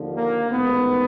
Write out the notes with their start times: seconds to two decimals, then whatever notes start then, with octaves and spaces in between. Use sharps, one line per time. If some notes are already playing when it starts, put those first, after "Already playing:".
Already playing: D#2 D3 F3
0.16 A#3
0.51 A1 G#2 D#3 B3